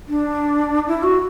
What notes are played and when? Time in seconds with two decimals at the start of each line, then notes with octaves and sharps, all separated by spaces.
0.08 D4
0.88 E4
1.03 F#4